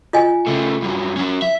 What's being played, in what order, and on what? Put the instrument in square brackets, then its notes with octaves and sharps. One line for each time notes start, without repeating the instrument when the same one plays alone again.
[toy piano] F4 D#5 G#5
[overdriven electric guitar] C#3 A3
G2 F#3
F#3 C#4
E5